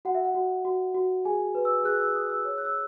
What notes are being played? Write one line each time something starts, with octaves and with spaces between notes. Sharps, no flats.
F#4 F#5
E5
F#5
F#4
F#4
F#4
G#4 G#5
B4
E6
G#4 F#6
E6
G#4 D#6
E6
C#5 E6
F#6
E6